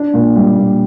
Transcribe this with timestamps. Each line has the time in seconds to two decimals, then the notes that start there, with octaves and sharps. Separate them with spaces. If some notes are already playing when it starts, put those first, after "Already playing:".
Already playing: D4
0.14 A#2
0.36 G3
0.58 A#2